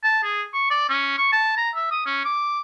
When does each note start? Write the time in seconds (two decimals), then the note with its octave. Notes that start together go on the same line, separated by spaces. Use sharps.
0.04 A5
0.24 G#4
0.54 C#6
0.70 D5
0.89 C#4
1.18 C#6
1.32 A5
1.57 A#5
1.75 E5
1.91 D#6
2.06 C#4
2.25 D6